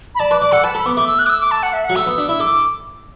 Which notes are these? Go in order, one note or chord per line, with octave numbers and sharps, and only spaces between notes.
B5
D5 A5
B4 D6
D5 D6
A4 F#5
B4 A5
A4 B5
B3 D6
A3 D6
E6
F#6
D6
E6
D6
A5
F#5
E5
F#5
F#3
A3 E6
B3
D4
E4 E6
A4 D6